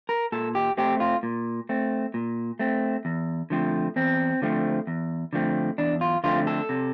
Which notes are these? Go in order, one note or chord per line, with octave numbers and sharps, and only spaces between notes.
A#4
A#2 A4
G4
A3 C4 G4
F4
A#2
A3 C4
A#2
A3 C4
E2
D3 F3 A3 C4
E2 C4
D3 F3 A3 C4
E2
D3 F3 A3 C4
E2 D4
F4
D3 F3 A3 C4 F4
A4
C3